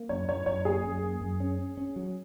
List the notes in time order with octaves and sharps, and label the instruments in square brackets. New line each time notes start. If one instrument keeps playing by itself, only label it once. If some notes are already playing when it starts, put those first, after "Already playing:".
Already playing: [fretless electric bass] A#3
[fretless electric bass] F#2 [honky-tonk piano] C#5
[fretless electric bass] F#2 [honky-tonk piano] C#5
[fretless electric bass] F#2 [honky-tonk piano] C#5
[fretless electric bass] A#3 [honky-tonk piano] G#4
[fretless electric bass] F#2
A#3
F#2
C#4
C#4
C#4
F#3